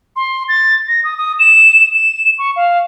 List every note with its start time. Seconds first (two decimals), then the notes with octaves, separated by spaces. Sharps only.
0.16 C6
0.49 A6
0.88 A#6
1.04 D#6
1.17 D#6
1.39 E7
1.94 E7
2.39 C#6
2.56 F5